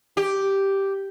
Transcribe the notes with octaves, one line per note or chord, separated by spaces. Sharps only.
G4